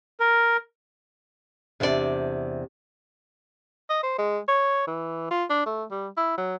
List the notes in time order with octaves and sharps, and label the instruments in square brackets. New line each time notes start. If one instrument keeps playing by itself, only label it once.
[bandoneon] A#4
[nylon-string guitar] E2 C3 C4 D4 F4 D5
[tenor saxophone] D#5
C5
G#3
C#5
E3
F4
D4
A3
G3
E4
F#3